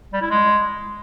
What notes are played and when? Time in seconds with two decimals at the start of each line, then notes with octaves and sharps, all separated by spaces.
0.13 G3
0.22 E4
0.30 G#3